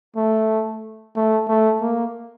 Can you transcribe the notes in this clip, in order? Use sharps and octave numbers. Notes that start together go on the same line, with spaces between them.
A3
A3
A3
A#3